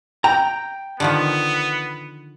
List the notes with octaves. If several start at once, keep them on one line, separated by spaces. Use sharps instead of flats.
G5 A#5
D3 D#3 F3 B3